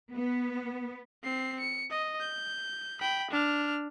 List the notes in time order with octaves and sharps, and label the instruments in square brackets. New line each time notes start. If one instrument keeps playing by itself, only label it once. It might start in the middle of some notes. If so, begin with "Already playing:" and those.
[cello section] B3
[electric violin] C4 C7
C#7
D#5
G6
G5 B5
D4 F6